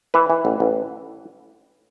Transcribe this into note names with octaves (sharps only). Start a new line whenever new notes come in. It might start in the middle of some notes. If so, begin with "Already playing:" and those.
E3 B4
E3
A1
A1